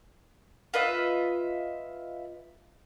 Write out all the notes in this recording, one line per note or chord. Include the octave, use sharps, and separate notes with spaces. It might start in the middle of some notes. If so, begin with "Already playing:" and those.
F4 B4 D#5 E5